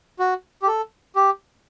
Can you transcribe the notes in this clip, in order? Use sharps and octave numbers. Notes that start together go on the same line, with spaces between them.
F#4
G4
A4
G4